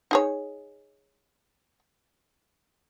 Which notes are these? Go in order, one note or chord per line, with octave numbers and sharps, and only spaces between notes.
D#4 G#4 C#5